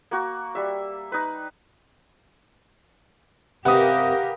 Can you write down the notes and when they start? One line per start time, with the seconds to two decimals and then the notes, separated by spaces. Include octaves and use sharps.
0.11 A#3 F#4
0.55 G3 E5
1.12 D#4 B4
3.65 C3 G4 A#4 B4 F5 F#5 D#6